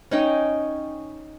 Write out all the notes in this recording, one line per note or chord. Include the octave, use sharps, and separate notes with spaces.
C#4 D#4 G5